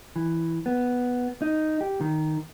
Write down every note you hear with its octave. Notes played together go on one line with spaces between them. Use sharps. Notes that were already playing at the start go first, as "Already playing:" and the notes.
E3
B3
D#4
G4
D#3